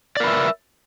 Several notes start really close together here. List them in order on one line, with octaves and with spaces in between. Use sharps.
D5 A#4 B4 E5